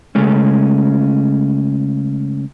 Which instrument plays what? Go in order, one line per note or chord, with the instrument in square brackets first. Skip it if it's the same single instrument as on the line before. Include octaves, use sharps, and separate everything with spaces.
[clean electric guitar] C#3 G#3 A3 C#4